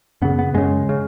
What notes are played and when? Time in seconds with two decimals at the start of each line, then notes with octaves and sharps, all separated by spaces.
0.22 F#2 C#3 B3
0.39 B3
0.54 F#2 C#3 G#3
0.89 C#3